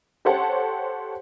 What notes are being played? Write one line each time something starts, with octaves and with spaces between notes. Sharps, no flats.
G4 A4 C5 C#5 F#5 A5